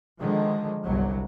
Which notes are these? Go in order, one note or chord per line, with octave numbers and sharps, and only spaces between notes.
D3 D#3 F3 G#3
G1 C2 F#3